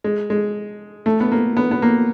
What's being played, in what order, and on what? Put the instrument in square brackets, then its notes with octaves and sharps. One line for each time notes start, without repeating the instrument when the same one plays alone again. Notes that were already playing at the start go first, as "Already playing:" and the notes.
[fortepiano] G#3
G#3
A3
B3
A#3
B3
B3
A#3